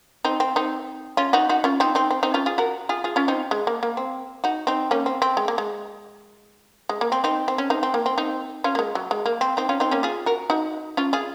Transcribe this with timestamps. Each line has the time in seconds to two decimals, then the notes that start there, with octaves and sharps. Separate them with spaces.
0.25 C4 D#4
0.40 C4
0.56 C4 D#4
1.17 C#4 F4
1.33 D#4 F#4
1.49 D#4 F#4
1.64 C#4 F4
1.80 C4 D#4
1.95 C4 D#4
2.11 C4
2.23 C4 D#4
2.34 C#4 F4
2.46 F4 G#4
2.58 F#4 A#4
2.89 F4 G#4
3.04 F4 G#4
3.16 C#4 F4
3.28 C4 D#4
3.51 G#3
3.67 A#3
3.83 A#3
3.97 C4
4.44 D#4 F#4
4.67 C4 D#4
4.91 A#3 C#4
5.06 C4
5.22 C4
5.37 G#3
5.48 A#3
5.58 G#3
6.89 G#3
7.01 A#3
7.12 C4
7.24 C4 D#4
7.48 C4
7.58 C#4
7.70 C4 D#4
7.83 C4
7.94 A#3
8.06 C4
8.18 C4 D#4
8.64 C#4 F4
8.75 A#3
8.79 G#3
8.95 F#3
9.11 G#3
9.26 A#3
9.41 C4
9.57 C4 D#4
9.69 C#4 F4
9.80 C4 D#4
9.91 A#3 C#4
10.03 F4 G#4
10.26 F#4 A#4
10.50 D#4 F#4
10.97 C#4 F4
11.13 F4 G#4